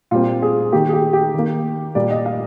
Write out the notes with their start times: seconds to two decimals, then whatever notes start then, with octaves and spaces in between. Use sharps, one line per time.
0.11 A#2 G3 C4 F4
0.42 G#4
0.72 D#3 A#3 G4
0.89 G#4
0.93 G4
1.13 G4
1.34 D#3 A#3
1.95 A#2 G3 A#3 D5
2.10 D#5
2.26 F5